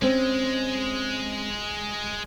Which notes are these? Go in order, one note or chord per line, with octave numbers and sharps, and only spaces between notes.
G#3 C4 C#4